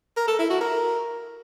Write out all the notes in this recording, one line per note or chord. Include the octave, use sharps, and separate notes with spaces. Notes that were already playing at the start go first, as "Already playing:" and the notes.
A#4
A4
E4
F#4
A#4